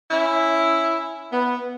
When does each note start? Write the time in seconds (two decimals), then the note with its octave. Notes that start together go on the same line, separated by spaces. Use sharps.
0.11 C#4 E4
1.32 B3